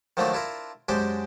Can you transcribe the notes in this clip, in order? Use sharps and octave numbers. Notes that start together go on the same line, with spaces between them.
D#3 F3 F#3 A3 A#3 D4
D4 E4 F4 A#4
F#2 G#3 D4 G4 C5 G5